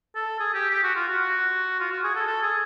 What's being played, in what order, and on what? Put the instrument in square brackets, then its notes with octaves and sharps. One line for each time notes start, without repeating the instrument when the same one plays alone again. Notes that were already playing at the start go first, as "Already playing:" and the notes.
[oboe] A4
G#4
G4
G4
F#4
F4
F#4
F4
F#4
G#4
A4
A4
G#4